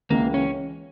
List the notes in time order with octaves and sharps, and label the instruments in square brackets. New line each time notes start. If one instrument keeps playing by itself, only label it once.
[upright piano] C#2 C#3 E3 [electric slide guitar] A#3
[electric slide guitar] C#4